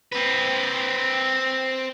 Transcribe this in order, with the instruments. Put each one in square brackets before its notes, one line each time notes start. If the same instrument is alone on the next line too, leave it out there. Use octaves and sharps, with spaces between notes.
[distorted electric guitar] C4 B4